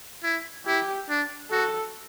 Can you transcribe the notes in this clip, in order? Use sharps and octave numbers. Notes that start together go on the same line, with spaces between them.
E4
E4 G4
D4
F#4 A4